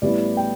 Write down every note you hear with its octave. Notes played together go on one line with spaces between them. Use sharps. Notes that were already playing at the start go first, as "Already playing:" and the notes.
A1 A2 G3 B3 E4 D5
G5